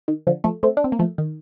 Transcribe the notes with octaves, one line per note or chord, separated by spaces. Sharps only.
D#3
D3 F3
F3 A3
A3 C4
D4
C4
A#3
F3 A3
D#3